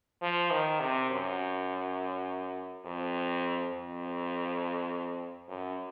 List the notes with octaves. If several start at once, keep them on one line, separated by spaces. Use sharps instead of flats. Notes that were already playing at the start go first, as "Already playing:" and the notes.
F3
D#3
C3
F#2
F2
F2
F#2